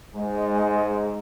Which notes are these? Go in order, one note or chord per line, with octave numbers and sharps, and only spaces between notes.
G#2 G#3